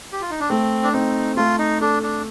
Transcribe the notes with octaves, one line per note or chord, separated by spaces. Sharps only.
G4
F4
D#4
D4
A3 C4
D4
C4 D#4
A3 F4
D#4
D4 A4
D4